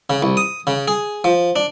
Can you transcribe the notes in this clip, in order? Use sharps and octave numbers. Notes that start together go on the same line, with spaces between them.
C#3
C2
D#6
C#3
G#4
F3
D4